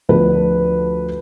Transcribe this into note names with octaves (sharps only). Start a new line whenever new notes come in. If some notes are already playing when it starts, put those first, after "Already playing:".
D2 D3 F3 B4